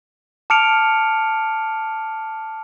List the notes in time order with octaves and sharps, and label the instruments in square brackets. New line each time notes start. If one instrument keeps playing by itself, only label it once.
[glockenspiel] A5 D6 F6 C#7 D7 F7